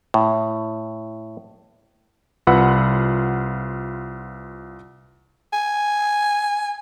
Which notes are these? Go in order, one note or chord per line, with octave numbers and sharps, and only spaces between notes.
A2
C2 F4 B4 F#5 B5 E6
G#5